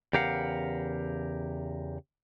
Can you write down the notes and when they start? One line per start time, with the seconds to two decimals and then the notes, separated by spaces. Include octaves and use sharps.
0.13 E2 C#3 G4 A#4 F5 F#5